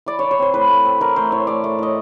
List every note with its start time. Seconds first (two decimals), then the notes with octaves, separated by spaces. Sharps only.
0.06 E3 D5
0.19 E3 C#5
0.31 C#5
0.39 C4 C5
0.54 A2 B4
0.69 A3
0.85 C4
1.01 E3 A#4
1.16 A3 C5
1.32 A2 C#5
1.47 A3 D5
1.64 A3
1.79 A2 D#5